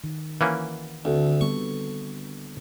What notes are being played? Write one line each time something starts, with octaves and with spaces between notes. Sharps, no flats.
D#3
E3 A#3 C#4 F#5
D2 C4 F#4 A4
D3 G3 B3 C#6